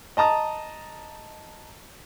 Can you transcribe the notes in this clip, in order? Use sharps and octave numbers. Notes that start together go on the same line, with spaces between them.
D#5 A5 A#5 D#6